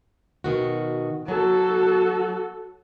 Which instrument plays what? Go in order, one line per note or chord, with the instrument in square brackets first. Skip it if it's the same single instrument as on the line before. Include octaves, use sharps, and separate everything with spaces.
[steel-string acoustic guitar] B2 D#3 F#4
[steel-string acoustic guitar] F#3 [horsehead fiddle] F#4 A4